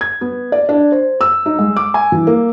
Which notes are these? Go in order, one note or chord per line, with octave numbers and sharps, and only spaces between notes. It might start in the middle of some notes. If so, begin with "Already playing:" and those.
G#6
B3
D5
D4
C5
E6
D#4
G#3
D6
G#5
E3
A#3